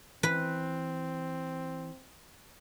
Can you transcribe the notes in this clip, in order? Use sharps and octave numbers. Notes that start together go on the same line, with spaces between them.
E3 C4 B4